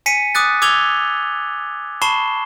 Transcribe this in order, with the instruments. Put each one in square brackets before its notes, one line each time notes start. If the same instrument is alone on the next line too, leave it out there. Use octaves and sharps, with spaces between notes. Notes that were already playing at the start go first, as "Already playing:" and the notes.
[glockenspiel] G#5 B6 C#7 D#7
D6 D#6 F#6 A6
D6 E6 G#6 F7 G7
A5 B5 C#6 C7 E7 G7